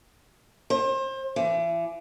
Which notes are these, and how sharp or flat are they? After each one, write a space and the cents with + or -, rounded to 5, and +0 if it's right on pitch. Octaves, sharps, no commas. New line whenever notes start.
C5 +30
E3 +35